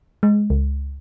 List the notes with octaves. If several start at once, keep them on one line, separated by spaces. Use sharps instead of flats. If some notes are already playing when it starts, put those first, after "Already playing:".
G#3
C#2